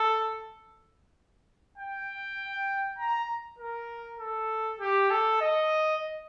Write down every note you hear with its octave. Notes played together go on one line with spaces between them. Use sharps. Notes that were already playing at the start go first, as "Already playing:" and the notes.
Already playing: A4
G5
A#5
A#4
A4
G4
A4
D#5